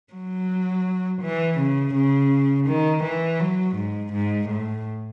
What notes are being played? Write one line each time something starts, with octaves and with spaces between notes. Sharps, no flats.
F#3
E3
C#3
C#3
D#3
E3
F#3
G#2
G#2
A2